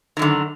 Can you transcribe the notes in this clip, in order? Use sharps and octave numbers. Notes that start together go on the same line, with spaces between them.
F#2 D3 D#3